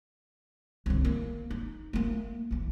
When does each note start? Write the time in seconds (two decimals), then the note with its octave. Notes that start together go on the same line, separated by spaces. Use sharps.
0.86 C2 D3
1.05 A#3
1.51 D#4
1.93 A3 A#3
2.51 B1 E3